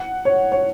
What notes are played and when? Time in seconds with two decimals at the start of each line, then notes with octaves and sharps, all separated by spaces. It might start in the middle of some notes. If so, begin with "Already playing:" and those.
Already playing: F#5
0.25 C#5
0.52 C#5